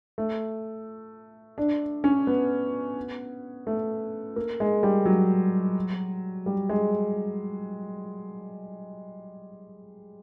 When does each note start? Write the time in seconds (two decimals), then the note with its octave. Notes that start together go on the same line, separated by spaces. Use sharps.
0.18 A3
1.58 D4
2.04 C#4
2.27 B3
3.67 A3
4.36 A#3
4.60 G#3
4.83 G3
5.06 F#3
6.46 G3
6.69 G#3